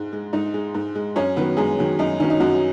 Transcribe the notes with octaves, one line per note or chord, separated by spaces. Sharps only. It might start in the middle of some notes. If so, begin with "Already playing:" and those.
Already playing: G#2 G#3
G#3
G#2 D#4 D#5
G#3
G#2
G#3
F#2 C#4 C#5
D#3 F#3 B3 B4
F#2 G#3 G#4
D#3 F#3
F#2 D#4
D#3 F#3 C#4
D#4
F#2 F#3 F#4